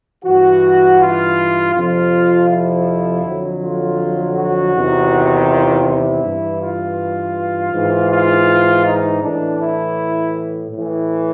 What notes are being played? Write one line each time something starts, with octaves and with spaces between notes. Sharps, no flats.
G2 E3 F#4
F4
F2 C3 F3 F4
E4
F2 D3 F#3
F4
F#4
E2 C3 D#3
F4
E4
G2 E3
F4
G#2 E3
F4
D#4
A2 E3 D4
E4
A2 E3